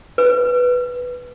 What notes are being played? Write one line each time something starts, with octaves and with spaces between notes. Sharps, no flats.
B4